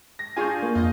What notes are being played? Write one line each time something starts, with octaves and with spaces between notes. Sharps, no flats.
A#6
D4 F4 G#4 G#5 C#6 G6
A#3
F2 F4 D#5